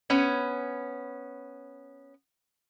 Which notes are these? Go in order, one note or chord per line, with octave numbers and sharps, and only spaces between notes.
B3 C#4